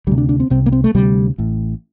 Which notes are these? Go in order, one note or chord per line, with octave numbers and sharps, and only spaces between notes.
D2 C3 G3
D4
D4
C4
C2 C3 C4
A#3
C4
A3
D2 C3 G3
A1 A2